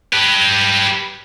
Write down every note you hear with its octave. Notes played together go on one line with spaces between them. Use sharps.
G4 B4